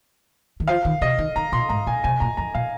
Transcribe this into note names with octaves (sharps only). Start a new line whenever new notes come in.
D#3
F3 F5
D#3
C3 D#5
D#3
D#3 A#5
A#2 C6
G#2 A#5
A#2 G#5
C3 G#5
A#2 A#5
F2 A#5
A#2 F5